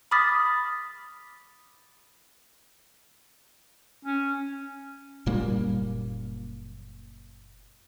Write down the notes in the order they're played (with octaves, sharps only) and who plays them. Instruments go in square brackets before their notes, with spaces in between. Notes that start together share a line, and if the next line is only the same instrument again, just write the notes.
[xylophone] B5 D6 D#6 F6 A6 B6
[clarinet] C#4
[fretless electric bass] F#1 A#2 G3 A#3